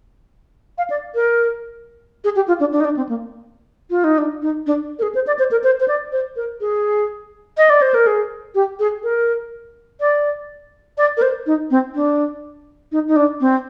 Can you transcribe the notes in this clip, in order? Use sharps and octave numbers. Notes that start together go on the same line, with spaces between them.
F5
D5
A#4
G#4
G4
F4
D4
D4
D#4
D4
C4
A#3
F4
D#4
D4
D#4
D4
A#4
G#4
C5
D5
C5
A#4
C5
C5
D5
C5
A#4
G#4
D#5
D5
C5
A#4
G#4
G4
G#4
A#4
D5
D5
A#4
C5
D#4
C4
D4
D#4
D#4
D4
C4